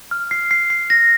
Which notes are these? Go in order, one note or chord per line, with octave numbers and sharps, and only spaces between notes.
F6
C7
C7
C7
A#6